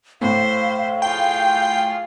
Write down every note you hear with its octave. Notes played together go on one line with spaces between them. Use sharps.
A2 C5 E5 F5
F4 G#4 G5